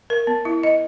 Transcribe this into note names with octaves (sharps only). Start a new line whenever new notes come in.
A#4
B3
E4
D#5